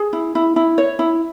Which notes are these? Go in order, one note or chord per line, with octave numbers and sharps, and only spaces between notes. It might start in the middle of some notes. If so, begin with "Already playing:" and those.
Already playing: G#4
E4
E4
E4
C#5
E4